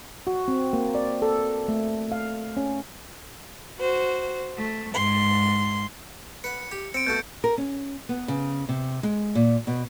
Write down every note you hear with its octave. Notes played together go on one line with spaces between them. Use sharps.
F#4
C4
A#3
D5
A4
A3
F5
C#4
F#4 C5
A3
G#2 C6
B4 F#5 C#7
G4
C4 C#7 D7
B2 A3 F#4 G6
A#4
C#4
B3
C#3
C3
G#3
A#2
B2